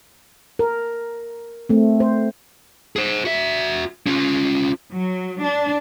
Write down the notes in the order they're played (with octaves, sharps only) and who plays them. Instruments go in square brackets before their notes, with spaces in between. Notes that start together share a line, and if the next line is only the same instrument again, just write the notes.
[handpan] A#4
A3 C4
C5
[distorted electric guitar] G#4 C5
F#4 E5
C#4 F4
[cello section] F#3
D4